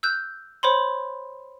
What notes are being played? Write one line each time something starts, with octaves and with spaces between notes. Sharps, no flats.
E6 F#6 G6
C5 C#5 B5 C6